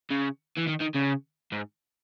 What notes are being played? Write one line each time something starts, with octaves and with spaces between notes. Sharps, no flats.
C#3
E3
D#3
D#3
C#3
G#2